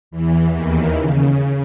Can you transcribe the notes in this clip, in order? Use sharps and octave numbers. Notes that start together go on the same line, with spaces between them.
E2 E3
D#2 D#3
C#3